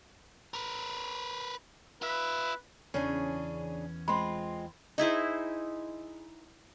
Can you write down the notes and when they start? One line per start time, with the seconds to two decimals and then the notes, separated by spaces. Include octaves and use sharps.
0.54 A#4 B4
2.02 F4 B4 E5
2.94 E2 C#3 E3 C#4 D4 G#4
4.08 G#3 C4 F4 B5 C6
4.98 D#4 E4 G#4 C5